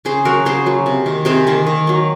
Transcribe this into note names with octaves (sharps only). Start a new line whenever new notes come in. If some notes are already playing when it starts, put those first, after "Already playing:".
C#3 G#4 C5
F#3 A#3 F#4 A#4
C#3 G#4 C5
F#3 A#3
C3
D#3 A#3
C3 G#4 C5
D#3 A#3
D#3
F#3 A#3